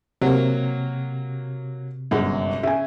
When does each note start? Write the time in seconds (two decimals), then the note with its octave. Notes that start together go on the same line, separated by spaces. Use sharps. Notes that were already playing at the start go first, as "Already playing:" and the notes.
0.21 C3 F#3 A#3
2.11 G1 F#2 G#3
2.63 C#3 E5 G#5